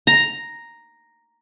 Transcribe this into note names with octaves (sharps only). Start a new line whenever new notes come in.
A#5